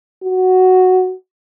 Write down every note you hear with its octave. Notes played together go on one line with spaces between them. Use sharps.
F#4